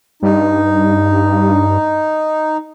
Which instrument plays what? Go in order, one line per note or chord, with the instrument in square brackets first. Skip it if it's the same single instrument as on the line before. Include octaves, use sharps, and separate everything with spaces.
[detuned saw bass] G2 [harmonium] D#4